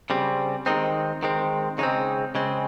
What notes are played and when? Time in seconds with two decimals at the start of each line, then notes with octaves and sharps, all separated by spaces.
0.10 C#3 G3 C4
0.66 D#3 G#3 C4 D#4
1.23 D#3 G#3 C4
1.78 C#3 G#3 C4 D#4
2.35 C#3 G#3 C4